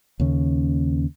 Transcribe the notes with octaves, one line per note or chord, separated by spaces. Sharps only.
D#2 C#3 C#4